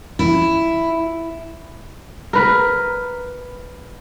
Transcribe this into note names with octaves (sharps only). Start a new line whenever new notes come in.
E4
A#4 B4